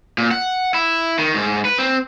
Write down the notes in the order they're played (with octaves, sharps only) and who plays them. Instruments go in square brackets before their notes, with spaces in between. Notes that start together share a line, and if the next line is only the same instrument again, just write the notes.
[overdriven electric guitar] A#2
F#5
E4
D#3
G#2
B4
C4